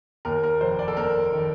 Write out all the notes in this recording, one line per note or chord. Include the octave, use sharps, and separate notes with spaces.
D#2 A#4
A#4
F1 C5
D5
A4
A#3 A#4
D#3